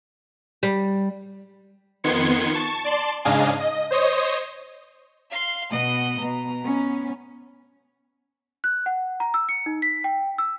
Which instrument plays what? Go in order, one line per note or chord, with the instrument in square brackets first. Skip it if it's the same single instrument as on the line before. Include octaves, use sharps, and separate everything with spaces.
[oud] G3
[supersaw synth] F2 D#3 B3 C6 G#6 C#7
A5 C#6
D5 A5 C6
G#2 C#3 D4 D#5 F5 G#5
D#5
C5 C#5 D#5 D#6
[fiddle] F5 C6
[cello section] B2 [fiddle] D#5 F#5
[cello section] B2 [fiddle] A#5
[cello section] B3 C#4
[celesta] F#6
F#5
A#5
E6
C#7
D#4
B6
G5
E6